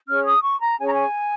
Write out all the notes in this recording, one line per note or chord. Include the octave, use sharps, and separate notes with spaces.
C#4 G#4 C#5 F6
D#6
C#6
A#5
C#4 G#4 C#5 G#5
A#5
G#5